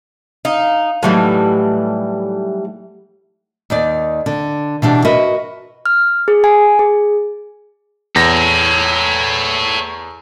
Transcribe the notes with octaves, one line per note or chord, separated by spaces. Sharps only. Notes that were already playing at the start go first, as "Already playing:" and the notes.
D#4 F5
A2 E3 F#3 G3 A3 D#4
D#2 D#3 D5
D3
B2 E3 D4 G4
F#4 A#4 B4 D#5 E5
F6
G#4
G#5
G#4
E2 A4 C#5 A#6